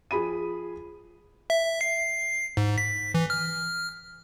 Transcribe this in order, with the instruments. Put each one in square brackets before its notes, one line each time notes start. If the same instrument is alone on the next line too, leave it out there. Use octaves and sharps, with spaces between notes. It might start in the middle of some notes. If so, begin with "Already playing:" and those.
[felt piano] F3 G#4 B5 D#7
[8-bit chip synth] E5
C7
G#2
B6
E3
F6